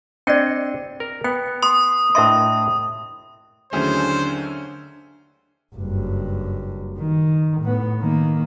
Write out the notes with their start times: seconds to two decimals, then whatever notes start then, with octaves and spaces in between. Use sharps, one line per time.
0.27 C4 D4 D5 D#5 G5
1.00 A#4
1.24 B3 G5
1.63 C6 D#6
2.15 A2 D4 A#4 D#5 E5 C6
3.73 D#2 D3 F#3 A3 C#4 E4 G#4 C5
5.75 F#1 G2
6.98 D#3
7.61 A2 B3
8.00 D#3 A#3